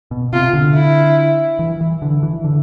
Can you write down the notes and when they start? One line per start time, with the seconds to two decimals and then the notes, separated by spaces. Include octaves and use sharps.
0.11 B2
0.33 C3 F4
0.53 D3
0.75 E4
1.59 E3
1.81 E3
2.02 D3
2.23 E3
2.44 D3